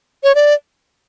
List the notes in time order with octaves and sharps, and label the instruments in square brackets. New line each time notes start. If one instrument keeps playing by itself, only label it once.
[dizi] C#5
D5